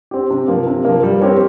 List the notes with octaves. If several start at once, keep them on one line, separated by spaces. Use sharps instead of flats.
C4 G4
C3
F3 A#3
C3
F3 A#3
G3
C4 G4 A#4 C#5